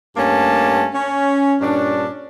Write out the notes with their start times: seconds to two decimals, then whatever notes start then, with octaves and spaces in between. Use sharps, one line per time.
0.17 G2 A3 A#3 C#4 A5
0.95 C#4
1.61 G2 A#2 C#4 D4